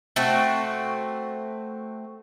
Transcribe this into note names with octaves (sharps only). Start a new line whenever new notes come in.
A3 C4 F#4